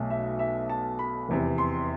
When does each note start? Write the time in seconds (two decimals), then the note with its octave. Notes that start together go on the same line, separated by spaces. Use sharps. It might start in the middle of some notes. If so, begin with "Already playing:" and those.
Already playing: B1 B2 A3
0.10 E5
0.39 E5
0.70 A5
0.99 B5
1.29 F1 E2 C3
1.58 C6